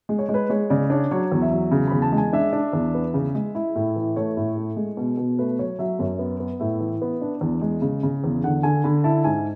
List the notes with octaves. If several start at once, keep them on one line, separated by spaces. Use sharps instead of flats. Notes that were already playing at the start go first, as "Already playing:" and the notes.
G#3
C#5
G#3
B4
G#3 C#5
C#3 D5
D4 C#5
F#3 C#5
E2
E5
F#3
C#3
E2 B5
A5
G#3
G#5
D4 E5
D4
E2
B3
C#3
G#3
E4
A2
E3
A3 C#5
A2
A3
G#3
B2
B2
A3 B4
F#3 C#5
F#3 E5
F#2 C#5
B3
B3
A2 E5
E3
B3
D4
E2
G#3
C#3
C#3
E2
D3 F#5
D3 G#5
D3 B5
E4 A5
G#2 G#5